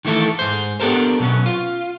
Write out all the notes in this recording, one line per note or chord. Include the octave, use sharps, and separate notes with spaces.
D#3 E3 A3 E4 A4
G#2 C5
B3 D4 G4 A4 A#4 C5
B2 F#3 B3 C#4
F4